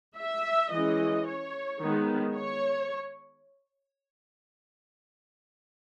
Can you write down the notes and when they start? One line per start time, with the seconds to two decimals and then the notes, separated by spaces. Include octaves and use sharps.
0.17 E5
0.72 E3 G#3 C#4 D#5
1.27 C#5
1.80 D#3 G#3 B3
2.36 C#5